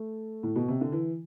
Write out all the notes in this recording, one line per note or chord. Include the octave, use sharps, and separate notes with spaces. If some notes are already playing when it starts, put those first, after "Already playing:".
Already playing: A3
A2
B2
C3
D3
E3